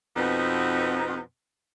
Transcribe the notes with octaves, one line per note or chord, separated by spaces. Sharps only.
F2 B2 B3 C4 D#4